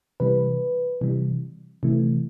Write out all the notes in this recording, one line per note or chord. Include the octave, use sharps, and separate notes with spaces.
C3 E3 G3 B4
C3 E3 G3
C3 E3 A3